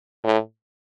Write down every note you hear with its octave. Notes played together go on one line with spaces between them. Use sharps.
A2